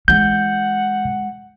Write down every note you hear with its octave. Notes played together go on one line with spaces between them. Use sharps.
E3 G#3 F#5 G6